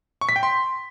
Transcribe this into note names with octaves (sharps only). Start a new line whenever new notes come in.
C#6
B6
G5
C6